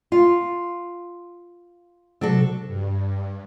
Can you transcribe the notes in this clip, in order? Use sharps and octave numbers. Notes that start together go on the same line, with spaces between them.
F4
C3 F#3 D4 F#4 A4
G2